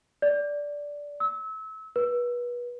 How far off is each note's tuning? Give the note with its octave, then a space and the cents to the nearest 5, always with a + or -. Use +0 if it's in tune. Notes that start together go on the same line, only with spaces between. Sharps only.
D5 -10
E6 -30
B4 -30